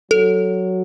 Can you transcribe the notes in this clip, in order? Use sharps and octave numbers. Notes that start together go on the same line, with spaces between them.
F#3 A4